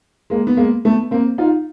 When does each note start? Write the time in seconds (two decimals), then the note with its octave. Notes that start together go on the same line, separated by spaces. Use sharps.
0.30 G#3 A#3
0.47 B3
0.57 G#3 A#3
0.85 A3 B3
1.11 A#3 C4
1.38 D#4 F4